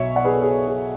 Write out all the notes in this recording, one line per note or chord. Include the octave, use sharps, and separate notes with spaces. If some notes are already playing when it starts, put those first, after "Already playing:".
Already playing: B1 B2 C#5 E5
D5 F#5
G#4 B4
A4
G#4
G#4